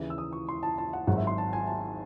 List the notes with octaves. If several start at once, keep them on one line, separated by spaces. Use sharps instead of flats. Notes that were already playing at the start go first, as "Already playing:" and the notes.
Already playing: D#2 C#3 E3
E6
D#6
C#6
C6
A5
A5
F#5
G#1 G#2 F#3 F#5
E5
C6
A5
G#5
A5